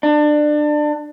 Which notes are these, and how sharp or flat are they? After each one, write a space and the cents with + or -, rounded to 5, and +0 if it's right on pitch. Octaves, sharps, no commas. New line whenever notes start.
D4 +25